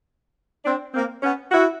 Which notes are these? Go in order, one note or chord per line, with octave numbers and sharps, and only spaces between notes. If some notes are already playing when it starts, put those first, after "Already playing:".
C4 D4
A#3 C4
B3 C#4
E4 F#4